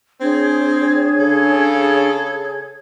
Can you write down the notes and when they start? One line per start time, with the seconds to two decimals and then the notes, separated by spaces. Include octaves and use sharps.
0.21 C4 D4 G#4 C#5 G#6
1.20 C#3 A4